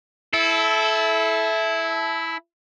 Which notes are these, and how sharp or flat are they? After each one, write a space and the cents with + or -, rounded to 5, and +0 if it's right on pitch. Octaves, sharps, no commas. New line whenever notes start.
E4 +0 A4 -25